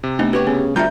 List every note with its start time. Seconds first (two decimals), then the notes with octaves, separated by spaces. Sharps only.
0.03 C3
0.19 A3 B3 D4 D#4
0.33 F#4 G4 B4 C#5
0.47 C#3 B3
0.76 D2 G3 D4 F4 E5 A#5 G6